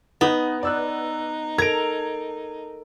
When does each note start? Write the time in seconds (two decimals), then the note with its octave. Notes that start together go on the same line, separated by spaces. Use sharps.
0.21 B3 D#4
0.63 D#4 D5 E6 F#6
1.58 A4 A#4 A#5 G#6 D7